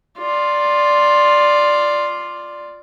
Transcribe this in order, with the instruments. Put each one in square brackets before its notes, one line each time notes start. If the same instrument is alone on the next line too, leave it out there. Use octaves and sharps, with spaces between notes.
[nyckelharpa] F4 D5